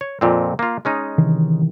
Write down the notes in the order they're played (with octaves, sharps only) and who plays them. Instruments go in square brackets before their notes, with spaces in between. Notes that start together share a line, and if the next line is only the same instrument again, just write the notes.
[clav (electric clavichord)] C#5
F2 A#2 C4
A#3 F4
G#3 C#4 D#4
[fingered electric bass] C3 D#3 E3